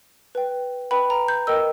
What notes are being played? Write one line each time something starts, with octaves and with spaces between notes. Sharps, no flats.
B4 G5
B4 G5 B5
A#5
G6
A#4 D#5 G5 E6